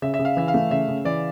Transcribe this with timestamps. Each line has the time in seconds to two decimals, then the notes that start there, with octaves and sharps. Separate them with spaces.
0.02 C#3 E5
0.14 E5
0.19 C#3
0.25 F5
0.37 E3 E5
0.48 F5
0.54 A3
0.71 C#3 E5
0.89 C#3
1.05 E3 D5